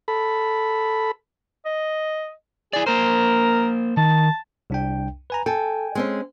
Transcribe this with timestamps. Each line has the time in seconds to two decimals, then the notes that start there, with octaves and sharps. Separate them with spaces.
0.08 A4 B5
1.65 D#5
2.73 E4 G#4 D5
2.87 A#3 A#4 C5
3.97 D#3 A5
4.70 C2 D4 G5
5.30 B4 G#5 A#5
5.46 A4 G5 G#5
5.95 G#3 C4 C#4